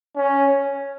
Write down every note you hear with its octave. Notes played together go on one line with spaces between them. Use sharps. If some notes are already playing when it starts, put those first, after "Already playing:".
C#4